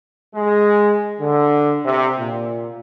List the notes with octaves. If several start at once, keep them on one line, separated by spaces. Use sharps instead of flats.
G#3
D3
C3
A#2